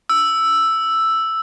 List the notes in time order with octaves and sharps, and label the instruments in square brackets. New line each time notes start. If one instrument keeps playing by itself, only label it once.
[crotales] E6